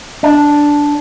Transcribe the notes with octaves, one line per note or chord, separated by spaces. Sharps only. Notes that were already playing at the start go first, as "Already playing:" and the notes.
D4